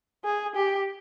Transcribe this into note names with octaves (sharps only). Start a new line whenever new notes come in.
G#4
G4